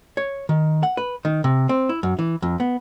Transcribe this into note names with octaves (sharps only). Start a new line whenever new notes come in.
C#5
D#3
F#5
B4
D#3
C3
C4
E4
F#2
E3
F2
B3